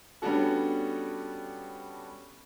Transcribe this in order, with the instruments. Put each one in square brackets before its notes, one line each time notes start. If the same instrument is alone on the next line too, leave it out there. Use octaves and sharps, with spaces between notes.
[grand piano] G3 B3 C#4 D4 F#4 A4